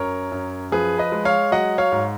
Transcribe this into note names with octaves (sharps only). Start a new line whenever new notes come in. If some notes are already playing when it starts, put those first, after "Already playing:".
Already playing: F#2 A#4 C#5
F#2
F3 G#4 B4
B4 D#5
G#3
C#5 F5
F#3 D#5 F#5
C#5 F5
G#2